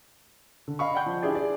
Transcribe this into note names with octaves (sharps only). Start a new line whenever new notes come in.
D3
D#5 F5 B5 C#6
D5 F#5 G5 G6
F3
D4 E4 G4 G#4 D5
G#4 D5